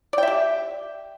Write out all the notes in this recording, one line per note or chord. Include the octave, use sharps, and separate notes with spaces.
G4 D5 E5 G5